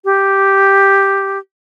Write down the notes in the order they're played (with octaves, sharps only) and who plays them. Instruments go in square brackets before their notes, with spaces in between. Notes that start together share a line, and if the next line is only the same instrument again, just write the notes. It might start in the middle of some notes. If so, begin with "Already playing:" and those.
[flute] G4